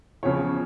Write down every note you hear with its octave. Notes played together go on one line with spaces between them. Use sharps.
E2 C#3 F3 C#5